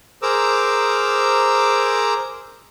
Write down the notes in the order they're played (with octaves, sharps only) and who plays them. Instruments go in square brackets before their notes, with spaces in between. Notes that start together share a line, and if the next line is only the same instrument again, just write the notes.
[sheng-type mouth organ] G#4 A#4 C5 A#5 D6 E6